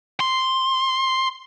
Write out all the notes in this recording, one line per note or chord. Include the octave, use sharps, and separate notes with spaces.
C6